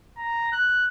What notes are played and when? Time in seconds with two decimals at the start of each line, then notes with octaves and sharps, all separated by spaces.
0.18 A#5
0.52 F#6